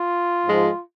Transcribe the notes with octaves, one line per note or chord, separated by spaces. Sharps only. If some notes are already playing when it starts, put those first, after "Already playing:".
Already playing: F4
G#2 F3 G#3